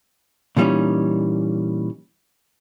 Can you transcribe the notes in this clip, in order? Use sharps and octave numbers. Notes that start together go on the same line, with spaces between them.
A#2 E3 G3 C4 C#4 D#4